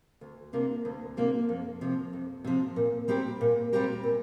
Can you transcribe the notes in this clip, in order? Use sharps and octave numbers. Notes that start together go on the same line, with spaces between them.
D2
C3 A#3 D4 A#4
D2
C3 A#3 D4 A#4
F2
C3 F3
F2
C3 F3
A#2
G3 C4 G4 A#4
A#2
G3 C4 G4 A#4
A#2